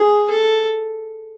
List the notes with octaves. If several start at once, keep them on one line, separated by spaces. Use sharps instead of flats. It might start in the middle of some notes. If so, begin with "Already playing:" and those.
Already playing: G#4
A4